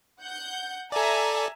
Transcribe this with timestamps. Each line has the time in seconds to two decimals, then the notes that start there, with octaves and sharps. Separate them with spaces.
0.21 F#5 G6
0.92 A4 D5 E5 G#5 A#5